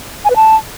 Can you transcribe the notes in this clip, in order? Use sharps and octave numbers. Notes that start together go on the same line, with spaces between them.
G#5
B4
A5